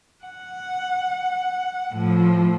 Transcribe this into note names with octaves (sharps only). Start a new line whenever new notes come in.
F#5
A2 F3